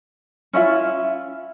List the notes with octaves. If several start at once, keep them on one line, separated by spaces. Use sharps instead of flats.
C#4 E4 F4 E5